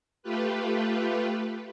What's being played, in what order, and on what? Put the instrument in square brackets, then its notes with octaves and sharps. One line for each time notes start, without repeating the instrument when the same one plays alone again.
[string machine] A3 F4 G4 B4